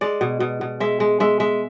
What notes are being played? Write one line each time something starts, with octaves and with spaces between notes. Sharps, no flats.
G#3 D5
B2
B2
B2
G#3 E5
G#3
G#3 E5
G#3 E5